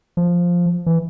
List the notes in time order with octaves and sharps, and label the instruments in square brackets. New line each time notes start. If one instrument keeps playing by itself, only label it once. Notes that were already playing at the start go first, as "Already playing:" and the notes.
[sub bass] F3
E3